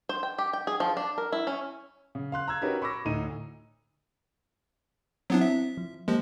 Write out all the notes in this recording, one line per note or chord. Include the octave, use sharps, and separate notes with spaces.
C5
G5
G4
G5
G#4
F3
D4
A#4
E4
C#4
C#3
F5 C6 F#6
A#5 E6 G#6
C#4 D#4 F#4 G4 A#4 B4
B5 C#6 D6 E6 A#6
D2 A2 D#4 D#7
F#3 B3 C4 D4 E4
E5
F3
F3 G#3 A#3 G4